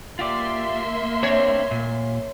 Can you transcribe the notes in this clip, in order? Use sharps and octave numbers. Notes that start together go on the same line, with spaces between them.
A#3 F4 G4 D5 E5 C6
C4 D4 C#5
A#2